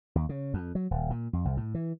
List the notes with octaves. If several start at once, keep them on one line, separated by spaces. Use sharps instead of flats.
D#2
C#3
F2
F#3
D#1
A#2
F2
C2
A2
E3